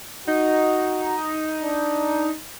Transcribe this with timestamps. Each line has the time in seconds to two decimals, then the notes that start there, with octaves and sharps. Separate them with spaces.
0.27 D#4 F#4
1.62 D4